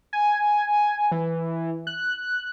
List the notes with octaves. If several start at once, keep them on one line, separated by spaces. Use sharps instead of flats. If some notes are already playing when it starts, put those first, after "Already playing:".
G#5
E3
F#6